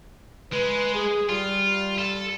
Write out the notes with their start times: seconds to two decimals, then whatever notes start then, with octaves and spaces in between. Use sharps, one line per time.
0.52 G#3 B4
0.94 G#4
1.29 G3 F4
1.99 A4